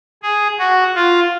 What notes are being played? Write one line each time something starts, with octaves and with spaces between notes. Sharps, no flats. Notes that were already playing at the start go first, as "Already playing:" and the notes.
G#4
F#4
F4